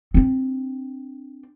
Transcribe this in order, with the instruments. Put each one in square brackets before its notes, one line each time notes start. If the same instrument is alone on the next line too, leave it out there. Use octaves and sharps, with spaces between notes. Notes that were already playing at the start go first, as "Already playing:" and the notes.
[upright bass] C4 D4